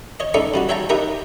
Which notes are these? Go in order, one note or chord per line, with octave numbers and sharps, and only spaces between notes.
C#5 D#5
C#2 D#4 A4 D5 E5 C#6
C#3 G3 F#4
C#5 E5 F5 G5 A5 A#5
D#4 G4 A#4 E5 F#5 G5